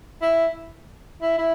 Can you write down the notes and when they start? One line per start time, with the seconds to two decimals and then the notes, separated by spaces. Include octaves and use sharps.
0.22 E4
1.22 E4
1.39 E4